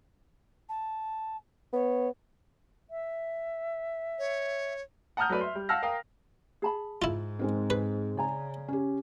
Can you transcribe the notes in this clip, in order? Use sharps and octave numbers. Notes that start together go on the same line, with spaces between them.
A5
B3 C#5
E5
C#5
F#5 A5 A#5 D#6 F6 G6
F#3 A3 B4 D5
E5 C6
G3
F5 F#5 A5 E6 F6 A#6
A#4 F5 G5 D#6
G#4 A5 B5
G#2 E4 F4
G#3 C4 D#4 A#4
G#4 B4
C#3 D5 G#5 A#5
C#4 G4